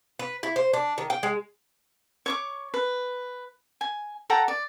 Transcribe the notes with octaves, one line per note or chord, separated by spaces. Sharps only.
B4
E4
C5
D4
D#3
G5
G#3
C#5 C#6 D6
B4
G#5
A4 F#5 G5 A#5
D5